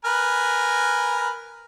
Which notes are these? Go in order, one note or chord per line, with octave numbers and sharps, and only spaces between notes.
A#4 B4 G#5